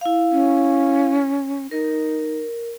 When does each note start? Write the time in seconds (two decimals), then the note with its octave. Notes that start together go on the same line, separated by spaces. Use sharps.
0.01 E4 F5
0.32 C#4
1.71 D#4 A#4